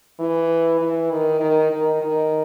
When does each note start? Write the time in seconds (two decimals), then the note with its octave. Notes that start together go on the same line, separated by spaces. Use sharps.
0.20 E3
0.80 E3
1.11 D#3
1.40 D#3
1.71 D#3
2.01 D#3